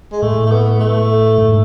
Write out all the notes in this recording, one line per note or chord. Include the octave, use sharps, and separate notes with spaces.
G#3
A2 A3
A3
B3
A3
G#2